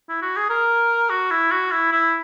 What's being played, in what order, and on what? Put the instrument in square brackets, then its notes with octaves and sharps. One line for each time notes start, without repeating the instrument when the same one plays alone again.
[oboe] E4
F#4
G#4
A#4
F#4
E4
F#4
E4
E4